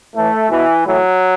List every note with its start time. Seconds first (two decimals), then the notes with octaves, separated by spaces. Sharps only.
0.15 A2 E3 A3
0.50 B2 E3
0.85 A2 E3 F#3